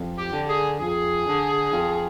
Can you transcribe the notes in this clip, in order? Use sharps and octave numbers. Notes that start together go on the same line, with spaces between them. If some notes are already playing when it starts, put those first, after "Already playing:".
Already playing: F2
G4
D3
G#4
F2 G#4
D3
F2